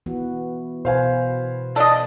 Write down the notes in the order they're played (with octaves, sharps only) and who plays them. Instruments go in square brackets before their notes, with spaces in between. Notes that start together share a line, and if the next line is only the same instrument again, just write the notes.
[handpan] E3 B3 F#4
[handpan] B2 B4 [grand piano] C5 F5 G#5
[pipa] A4 D#5 [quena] D5